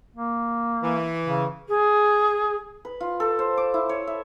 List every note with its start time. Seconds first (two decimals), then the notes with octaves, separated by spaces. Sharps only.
0.17 A#3
0.82 E3
1.25 C#3
1.68 G#4
2.85 B4
3.01 F4
3.20 A4
3.39 C5
3.57 D6
3.74 E4
3.89 C#5
4.07 E5